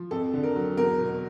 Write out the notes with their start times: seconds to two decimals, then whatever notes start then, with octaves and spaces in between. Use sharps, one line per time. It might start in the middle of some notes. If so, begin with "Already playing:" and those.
Already playing: F3
0.11 F2 A4
0.33 D3
0.43 A#4
0.56 F#3
0.77 E2 A#4
0.99 B2